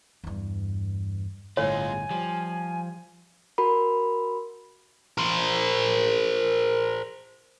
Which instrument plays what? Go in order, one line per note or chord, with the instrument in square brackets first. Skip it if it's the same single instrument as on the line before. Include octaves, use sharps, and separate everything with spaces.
[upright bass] E2 G2
[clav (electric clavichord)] G1 A2 [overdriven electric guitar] G#3 F4 [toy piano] C#5 [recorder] G#5
[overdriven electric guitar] F3 [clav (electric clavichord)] G3
[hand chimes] F#4 A#4 B5
[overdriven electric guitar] A#4 C5